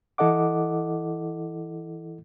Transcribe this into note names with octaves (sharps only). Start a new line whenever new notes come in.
E3 E4 A4 D#5 F#5 D6